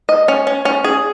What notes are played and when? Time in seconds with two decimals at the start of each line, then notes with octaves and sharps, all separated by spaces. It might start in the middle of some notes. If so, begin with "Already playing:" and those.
0.09 D#5
0.28 C#4
0.47 C#4
0.65 C#4
0.84 G#4